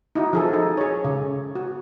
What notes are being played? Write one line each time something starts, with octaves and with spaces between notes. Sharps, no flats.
D#4 E4 F#4
F3 G#4 A4
D#4
G#4 C#5
C#3
F#4